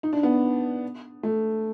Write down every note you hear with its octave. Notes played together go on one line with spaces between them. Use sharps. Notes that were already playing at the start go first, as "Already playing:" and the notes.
D#4
D4
B3
A3